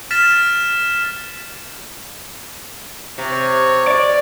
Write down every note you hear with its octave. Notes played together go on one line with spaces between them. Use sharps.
F6 A6 B6 E7
C3 C#5
D5